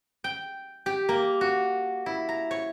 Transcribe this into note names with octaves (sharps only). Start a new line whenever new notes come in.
G5
G4
A#3
F#4
E4
A#5
C#5